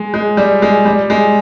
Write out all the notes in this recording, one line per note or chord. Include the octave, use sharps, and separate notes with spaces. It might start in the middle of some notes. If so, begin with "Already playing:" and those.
Already playing: G#3
G#3
G3
G#3
G3
G#3